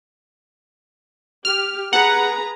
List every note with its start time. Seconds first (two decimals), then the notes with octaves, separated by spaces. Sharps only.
1.45 G4 F6
1.93 G#4 B4 F#5 A#5